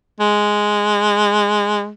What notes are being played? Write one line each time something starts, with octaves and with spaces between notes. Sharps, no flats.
G#3